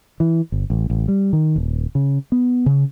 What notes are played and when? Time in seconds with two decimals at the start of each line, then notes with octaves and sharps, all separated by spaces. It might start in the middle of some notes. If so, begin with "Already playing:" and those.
0.20 E3
0.52 G1
0.70 A1
0.90 A1
1.08 G3
1.33 D#3
1.56 D#1
1.95 C#3
2.32 B3
2.66 C#3